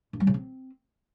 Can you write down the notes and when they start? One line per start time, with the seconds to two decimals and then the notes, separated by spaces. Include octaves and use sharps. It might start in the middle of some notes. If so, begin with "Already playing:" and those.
0.13 G2
0.20 G3
0.27 C#3
0.34 C4